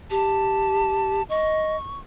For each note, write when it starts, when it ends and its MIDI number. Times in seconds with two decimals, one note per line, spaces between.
0.11 1.22 67
0.11 1.23 81
1.30 1.77 75
1.30 1.98 85